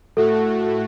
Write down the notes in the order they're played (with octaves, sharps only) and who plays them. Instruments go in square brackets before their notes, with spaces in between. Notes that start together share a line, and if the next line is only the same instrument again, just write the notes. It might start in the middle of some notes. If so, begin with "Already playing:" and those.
[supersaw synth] A2 A3 F#4 [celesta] A4